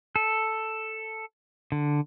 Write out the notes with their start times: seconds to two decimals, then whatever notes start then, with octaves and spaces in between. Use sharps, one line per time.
0.16 A4
1.72 D3